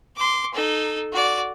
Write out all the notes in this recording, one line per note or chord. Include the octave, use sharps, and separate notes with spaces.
C6 D6
D#4 A4
F#4 D5